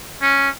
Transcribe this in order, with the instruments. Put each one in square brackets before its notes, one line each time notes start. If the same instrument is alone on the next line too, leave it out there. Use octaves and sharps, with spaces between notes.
[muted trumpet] C#4